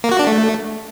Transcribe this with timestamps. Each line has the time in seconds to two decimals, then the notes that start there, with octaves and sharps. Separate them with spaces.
0.04 A#3
0.11 F#4
0.19 D4
0.27 A3